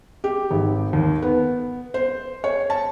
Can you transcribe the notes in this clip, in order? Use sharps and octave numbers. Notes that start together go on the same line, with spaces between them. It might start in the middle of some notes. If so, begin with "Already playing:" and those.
G4
G#1
D#2
B3
C5
C#5
A5